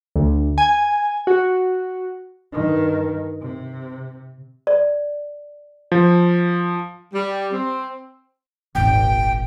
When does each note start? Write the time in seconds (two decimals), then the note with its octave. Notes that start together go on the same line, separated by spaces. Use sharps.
0.16 D2
0.58 G#5
1.27 F#4
2.53 G2 D#3
3.41 C3
4.67 D5
5.92 F3
7.14 G3
7.52 C4
8.75 D#1 G#1 G5